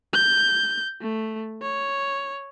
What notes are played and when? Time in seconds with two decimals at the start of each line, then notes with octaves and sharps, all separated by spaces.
0.13 G6
1.01 A3
1.62 C#5